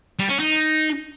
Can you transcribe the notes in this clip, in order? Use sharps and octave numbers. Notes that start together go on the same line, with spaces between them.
G3
C#4
D#4